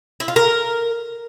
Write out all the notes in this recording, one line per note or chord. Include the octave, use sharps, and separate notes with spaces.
E4
F4
A#4